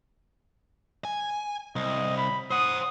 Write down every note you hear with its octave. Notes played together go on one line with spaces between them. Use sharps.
G#5
C2 D#5
B5
C5 F#5 D#6